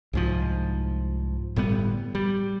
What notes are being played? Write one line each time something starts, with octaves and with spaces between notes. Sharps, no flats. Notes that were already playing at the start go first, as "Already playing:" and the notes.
C2 G#2 F3
G1 A2 G3 B3
G3